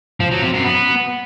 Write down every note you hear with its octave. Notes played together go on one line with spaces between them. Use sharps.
F3
F#3
C3
F#2
B3